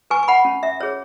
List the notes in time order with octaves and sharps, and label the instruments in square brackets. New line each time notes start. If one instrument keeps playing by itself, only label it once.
[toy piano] B4 G#5 C#6
C#6
F#5 B5
C#4
E5
G#4 C#5